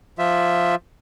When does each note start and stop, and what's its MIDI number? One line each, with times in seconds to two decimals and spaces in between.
0.19 0.75 53
0.19 0.75 65
0.19 0.75 76